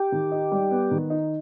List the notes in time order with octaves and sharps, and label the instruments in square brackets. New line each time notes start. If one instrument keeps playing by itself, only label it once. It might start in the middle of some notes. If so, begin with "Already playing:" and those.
Already playing: [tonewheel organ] G4
[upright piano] D#3
D#4
G3
B3
D#3
D#4